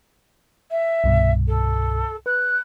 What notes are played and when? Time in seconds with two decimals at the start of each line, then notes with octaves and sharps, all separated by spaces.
0.71 E5
1.04 C2 G2 B2
1.47 A4
2.26 B4 F#6